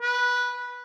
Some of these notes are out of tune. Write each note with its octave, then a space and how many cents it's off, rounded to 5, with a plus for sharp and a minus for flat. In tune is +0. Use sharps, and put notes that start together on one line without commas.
B4 -10